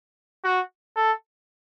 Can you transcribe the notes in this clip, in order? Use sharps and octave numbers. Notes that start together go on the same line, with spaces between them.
F#4
A4